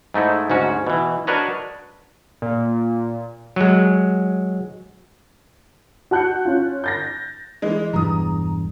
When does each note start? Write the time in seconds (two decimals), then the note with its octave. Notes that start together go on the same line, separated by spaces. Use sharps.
0.14 G#2 A3 D#4 E4
0.50 D2 G#2 C#4 F#4
0.87 B2 E3
1.27 D4 F#4 A#4 B4 C#5 D#5
2.42 A#2
3.56 F#3 G#3
6.11 F#4 A5 F#6 G6 C#7
6.45 C#4 F4
6.84 G6 A6 A#6
7.62 E3 G#3
7.93 E1 E2 G2 A#5 D#6